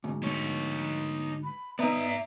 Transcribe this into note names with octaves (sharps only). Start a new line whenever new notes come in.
D2 G#2
D#4 C#5
B5
B3 D#4 D5 E5 A#5